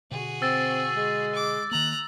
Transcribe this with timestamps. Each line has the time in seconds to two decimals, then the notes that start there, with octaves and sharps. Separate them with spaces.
0.11 B2 D3 F#4 G#4
0.42 C4 E6 A6
0.96 G#3
1.35 D6
1.71 D#3 A#3 A#5 F#6